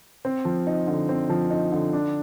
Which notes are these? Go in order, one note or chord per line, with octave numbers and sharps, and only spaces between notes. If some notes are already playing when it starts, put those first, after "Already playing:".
C4
F3
D#4
D3
C4
F3
D#4
D3
D4